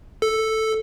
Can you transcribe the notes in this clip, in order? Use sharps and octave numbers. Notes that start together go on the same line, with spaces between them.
A4